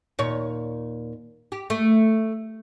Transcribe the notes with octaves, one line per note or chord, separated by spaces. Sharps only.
D#2 A#2 C#5
G4
A3